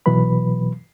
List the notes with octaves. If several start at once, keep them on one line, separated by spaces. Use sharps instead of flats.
B2 E3 F#3 B4 B5